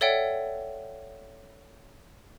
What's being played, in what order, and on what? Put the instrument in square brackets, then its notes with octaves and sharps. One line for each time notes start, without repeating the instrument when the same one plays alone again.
[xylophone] A4 C#5 D5 E5 F#5 G5